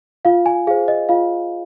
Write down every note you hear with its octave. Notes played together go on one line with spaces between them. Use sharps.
F4 F5
G#5
G#4 C5 F5
D#5
F4 F5